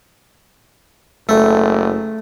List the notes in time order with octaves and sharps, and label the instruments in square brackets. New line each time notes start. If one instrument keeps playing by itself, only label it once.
[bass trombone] F#1 [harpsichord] A3